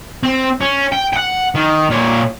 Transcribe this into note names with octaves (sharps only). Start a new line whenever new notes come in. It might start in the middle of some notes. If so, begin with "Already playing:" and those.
C4
C#4
G5
F#5 G5
D#3
A#2 C#5